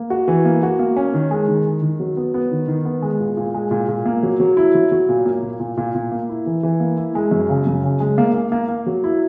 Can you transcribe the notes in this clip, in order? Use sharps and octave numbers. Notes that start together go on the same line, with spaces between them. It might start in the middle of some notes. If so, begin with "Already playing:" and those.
Already playing: A#3
F#4
E3
A#3
F#4
A#3
C#4
D#3
G#3
D#3
D#3
D#3
F#3
B3
B3
D#3
D#3
B3
G#3
A#2
A#2
G#3
A#2
A#2
A#3
F#3
F#3
E4
F#3
F#3
A#2
A#3
A#2
A#2
A#2
A#2
A#3
E4
E3
E3
A#3
E4
G#3
F#2
C#3
F#2
C#3
G#3
A#3
A#3
A#3
A#3
F#3
E4